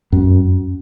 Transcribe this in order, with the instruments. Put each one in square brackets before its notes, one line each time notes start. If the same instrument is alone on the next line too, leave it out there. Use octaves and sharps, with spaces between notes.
[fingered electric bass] F#2